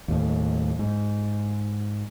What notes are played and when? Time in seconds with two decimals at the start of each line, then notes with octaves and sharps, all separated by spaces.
0.08 D#2 A2
0.79 G#2